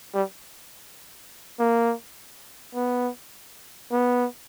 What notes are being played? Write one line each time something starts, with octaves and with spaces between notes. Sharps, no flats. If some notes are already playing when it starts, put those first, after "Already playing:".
G3
A#3
B3
B3